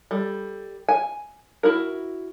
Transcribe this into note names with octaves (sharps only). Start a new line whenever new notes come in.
G3 A4
G#5
E4 F#4 A#4